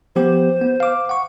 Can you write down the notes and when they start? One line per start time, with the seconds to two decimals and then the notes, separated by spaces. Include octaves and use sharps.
0.16 F3 B3 G4 C5
0.61 B3
0.80 F5 D6
1.09 F#5 C#6